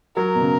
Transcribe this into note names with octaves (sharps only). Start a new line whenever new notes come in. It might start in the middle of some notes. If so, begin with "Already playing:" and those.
F#3 A#4
B2
C#3